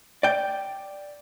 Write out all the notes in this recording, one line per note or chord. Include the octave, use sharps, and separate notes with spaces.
D5 G5